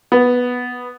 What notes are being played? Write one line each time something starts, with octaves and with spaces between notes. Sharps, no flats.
B3